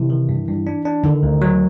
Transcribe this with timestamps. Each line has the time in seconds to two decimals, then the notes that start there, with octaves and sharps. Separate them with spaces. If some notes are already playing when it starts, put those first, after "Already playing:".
Already playing: C3 E3
0.10 D#3
0.29 G2
0.48 G2
0.67 D4
0.85 D4
1.04 D3 D#3
1.23 D2
1.42 F#3